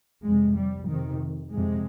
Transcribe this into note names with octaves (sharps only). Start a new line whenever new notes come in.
F2 C3 G#3
G3
F2 C3 D#3
F2 C3 G#3